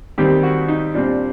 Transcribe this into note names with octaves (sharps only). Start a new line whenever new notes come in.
D#2 D#3 G3 C4 G4
F#4
D#4
A#2 G3 C4 D4